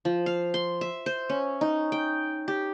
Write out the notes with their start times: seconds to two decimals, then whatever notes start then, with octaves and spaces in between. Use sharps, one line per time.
0.05 F3
0.26 F5
0.54 C6
0.81 E5
1.06 C5
1.29 C#4
1.61 D#4
1.92 G5
2.48 G4